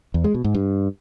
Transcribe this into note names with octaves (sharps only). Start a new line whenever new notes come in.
E2
G#3
B2
G#2
G2